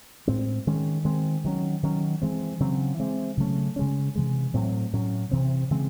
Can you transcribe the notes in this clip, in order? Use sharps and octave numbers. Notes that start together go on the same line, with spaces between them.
A2 G#3 C4
D#3 G#3 C#4
D#3 G#3 C4
D#3 F#3 C#4
D#3 F#3 C#4
E3 G#3 C4
C#3 F#3 C4
E3 G#3 C4
C#3 F#3 A3 C#4
C#3 G#3 C#4
C3 E3 G#3
A2 F#3 C4
A2 F#3 C#4
C3 E3 C4
C#3 E3 G#3 C4